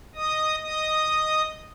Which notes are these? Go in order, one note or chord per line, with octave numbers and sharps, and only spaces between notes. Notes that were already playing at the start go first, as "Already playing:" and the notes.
D#5 D#6
D#5 D#6